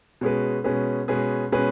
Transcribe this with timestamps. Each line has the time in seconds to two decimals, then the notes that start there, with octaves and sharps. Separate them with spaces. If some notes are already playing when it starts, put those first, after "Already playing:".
0.21 B2 G#3 C#4 G#4 B4
0.64 B2 G#3 C#4 G#4 B4
1.08 B2 G#3 C#4 G#4 B4
1.52 B2 G#3 C#4 G#4 B4